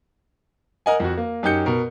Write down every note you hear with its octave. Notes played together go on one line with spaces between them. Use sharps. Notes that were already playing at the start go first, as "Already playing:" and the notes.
A#4 D#5 F#5 G#5
F2 F#4
A#3
F#2 D#4 G4 G6 C#7
B2 A#4